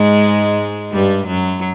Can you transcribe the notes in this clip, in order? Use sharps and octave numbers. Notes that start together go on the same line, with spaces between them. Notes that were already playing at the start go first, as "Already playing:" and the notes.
Already playing: G#2 G#3
G2 G3
F#2 F#3